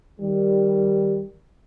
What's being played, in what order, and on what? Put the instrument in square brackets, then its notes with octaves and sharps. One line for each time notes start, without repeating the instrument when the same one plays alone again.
[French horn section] D#3 G3